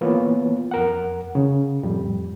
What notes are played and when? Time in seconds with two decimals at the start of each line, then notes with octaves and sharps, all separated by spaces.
0.01 E3 A#3 B3 F4 B4 C#5
0.71 F2 A#4 F#5
1.35 C#3
1.83 F2 A2 G3